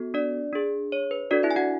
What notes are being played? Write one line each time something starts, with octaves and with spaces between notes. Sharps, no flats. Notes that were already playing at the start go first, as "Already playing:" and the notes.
Already playing: B3 F#4 A4
D4 D5
D4 G#4
C#5
B4
D4 F#4 A4 D5
E4 E5
G#5
F#4 F#5